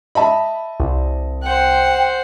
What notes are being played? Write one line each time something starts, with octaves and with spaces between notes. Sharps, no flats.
D#5 E5 A5 B5
C2
C5 F#5 G5